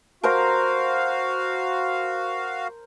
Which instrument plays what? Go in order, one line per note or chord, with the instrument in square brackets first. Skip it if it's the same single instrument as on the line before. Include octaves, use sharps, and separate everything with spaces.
[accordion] F#4 F5 [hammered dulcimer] A#4 C5 A#5